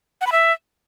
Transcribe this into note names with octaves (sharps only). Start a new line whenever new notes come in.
F#5
B5
E5